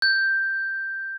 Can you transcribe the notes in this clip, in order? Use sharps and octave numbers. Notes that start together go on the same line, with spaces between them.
G6